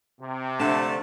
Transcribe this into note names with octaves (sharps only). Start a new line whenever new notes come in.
C3
D3 F3 A3 D4